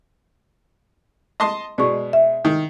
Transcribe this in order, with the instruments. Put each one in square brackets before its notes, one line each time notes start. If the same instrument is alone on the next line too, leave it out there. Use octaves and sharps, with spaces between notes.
[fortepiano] D#5 A5 C6
[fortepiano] B2 G#3 [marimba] D5 C#6
[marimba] E5
[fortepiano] D#3